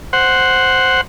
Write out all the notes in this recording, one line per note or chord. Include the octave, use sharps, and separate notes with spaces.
C5 F#5